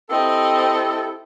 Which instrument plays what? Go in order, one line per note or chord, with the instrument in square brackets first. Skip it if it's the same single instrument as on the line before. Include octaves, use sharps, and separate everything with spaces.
[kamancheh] C4 D#5 [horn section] E4 G4 A4